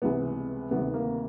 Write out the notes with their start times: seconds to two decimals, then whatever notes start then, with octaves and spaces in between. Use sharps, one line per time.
0.02 C#2 C3 E3 G3 B3
0.71 D2 C3 D#3 G3 B3
0.94 A#3